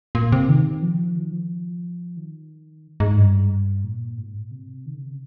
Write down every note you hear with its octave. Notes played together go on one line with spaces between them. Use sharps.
A#2
C3
D#3
F3
D#3
F3
D#3
G#2
G2
A#2
G#2
A#2
C3
D#3
C#3
C3
C#3